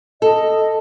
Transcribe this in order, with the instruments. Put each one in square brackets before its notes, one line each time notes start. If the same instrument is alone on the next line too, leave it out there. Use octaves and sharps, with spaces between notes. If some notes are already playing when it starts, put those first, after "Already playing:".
[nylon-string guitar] A4 [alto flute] D#5